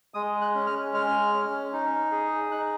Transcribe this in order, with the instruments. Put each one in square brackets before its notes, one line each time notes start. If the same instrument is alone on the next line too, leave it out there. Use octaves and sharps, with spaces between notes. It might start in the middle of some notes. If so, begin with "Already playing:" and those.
[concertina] G#3 D#6
F#6
C#4
F6
G#3 F6
C#4
D#4
G#4
D#4 F#6